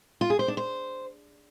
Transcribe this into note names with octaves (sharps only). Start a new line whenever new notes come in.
F4
G#4
C5
D4
C5